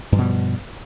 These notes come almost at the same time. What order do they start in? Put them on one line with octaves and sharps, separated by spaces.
G2 F3 B2 G3